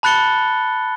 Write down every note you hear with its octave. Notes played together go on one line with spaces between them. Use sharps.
A5 B5 F#6 A6 C#7 G7